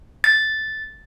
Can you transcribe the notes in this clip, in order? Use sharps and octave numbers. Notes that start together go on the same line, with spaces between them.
A6